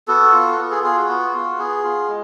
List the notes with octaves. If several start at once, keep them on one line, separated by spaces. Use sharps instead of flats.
B3 F#4 A4
F4
B3
G#4
F4 G#4
F#4
B3
F4
B3 G#4
F4
G#3